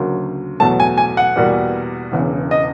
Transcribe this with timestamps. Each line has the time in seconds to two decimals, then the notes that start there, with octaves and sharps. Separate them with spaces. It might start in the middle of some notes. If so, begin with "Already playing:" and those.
Already playing: D2 C#3 F#3 A#3
0.60 E2 B2 F#3 A3 A5
0.80 G#5
0.98 G#5
1.17 F#5
1.36 E2 B2 G3 A#3
2.12 E1 E2 C#3
2.51 D#5